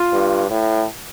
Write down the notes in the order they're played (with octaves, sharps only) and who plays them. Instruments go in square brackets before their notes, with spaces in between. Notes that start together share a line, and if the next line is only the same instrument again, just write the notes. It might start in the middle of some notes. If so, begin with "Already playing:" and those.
Already playing: [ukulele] F4
[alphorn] G2
A2